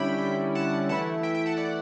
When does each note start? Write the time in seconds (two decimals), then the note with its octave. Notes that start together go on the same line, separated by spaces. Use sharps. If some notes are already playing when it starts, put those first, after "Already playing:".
Already playing: D3 G3 C#4 E4 G5 B5
0.55 F#5 A5
0.89 E3 A3 E4 F#5 A5
1.23 E5 G5
1.35 E5 G5
1.46 F#5 A5
1.57 D5 F#5